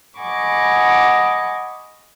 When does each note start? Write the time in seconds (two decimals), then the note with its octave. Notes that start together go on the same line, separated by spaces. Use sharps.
0.18 D#5 F#5 G#5 B5 C#6 D6